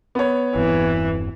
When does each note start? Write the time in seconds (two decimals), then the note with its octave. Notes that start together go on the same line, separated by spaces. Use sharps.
0.15 B3 C#5
0.55 E1 G2 E3 C4